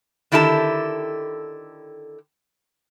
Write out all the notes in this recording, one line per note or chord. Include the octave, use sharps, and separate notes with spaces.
D3 D#3 E4 G4 A4 A5